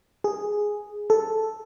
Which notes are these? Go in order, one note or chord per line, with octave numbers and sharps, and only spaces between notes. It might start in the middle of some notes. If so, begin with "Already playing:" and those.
G#4
A4